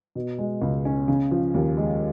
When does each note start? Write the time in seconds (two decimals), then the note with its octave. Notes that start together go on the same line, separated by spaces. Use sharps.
0.15 B2
0.39 G#3
0.62 C#2
0.85 C#4
1.08 C#3
1.31 F3
1.54 D#2
1.77 G#3